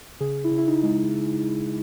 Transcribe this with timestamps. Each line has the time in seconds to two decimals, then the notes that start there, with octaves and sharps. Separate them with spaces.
0.20 C#3 G#4
0.44 E4
0.51 C#3
0.58 E4
0.68 D#4
0.83 G#3